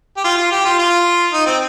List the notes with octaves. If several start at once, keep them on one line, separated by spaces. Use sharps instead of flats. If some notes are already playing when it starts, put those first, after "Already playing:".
G4
F4
F4
G4
F4
F4
D#4
C4